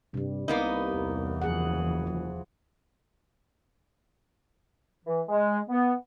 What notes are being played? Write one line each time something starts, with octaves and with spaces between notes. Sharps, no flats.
G2 C3 G3
C2 A#3 B3 D#4
E2 E3
F#1 F3 G#4 F#5
F3
E3
G#3
B3